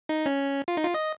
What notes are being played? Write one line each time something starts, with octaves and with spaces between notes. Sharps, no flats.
D#4
C#4
F4
D#4
F4
D#5